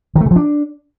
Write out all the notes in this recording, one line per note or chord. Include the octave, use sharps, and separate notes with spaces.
D#3
A3
C#3
F3
D4